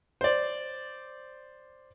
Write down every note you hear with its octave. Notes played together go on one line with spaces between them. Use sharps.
C5 D5